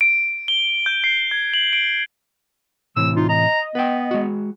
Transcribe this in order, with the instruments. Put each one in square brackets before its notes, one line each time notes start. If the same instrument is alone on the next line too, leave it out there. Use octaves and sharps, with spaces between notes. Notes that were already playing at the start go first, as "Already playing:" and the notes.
[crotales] D7
G7
G6
C7
G#6
F#7
D7
[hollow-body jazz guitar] A2 C3 E3 [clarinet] E6
[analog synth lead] D#4 [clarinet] F4
[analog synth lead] D#5 [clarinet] A#5
[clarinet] B3 [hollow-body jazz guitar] B4 G5
[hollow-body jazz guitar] G#3 F#4